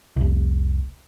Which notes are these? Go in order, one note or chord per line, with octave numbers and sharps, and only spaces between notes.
F1 C2